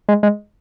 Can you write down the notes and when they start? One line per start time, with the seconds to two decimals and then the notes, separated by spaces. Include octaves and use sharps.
0.09 G#3
0.23 G#3